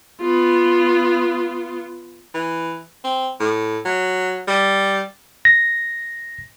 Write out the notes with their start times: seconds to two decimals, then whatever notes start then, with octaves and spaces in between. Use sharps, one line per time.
0.20 B3 F4
2.34 E3
3.04 C4
3.40 A2
3.85 F#3
4.48 G3
5.45 A#6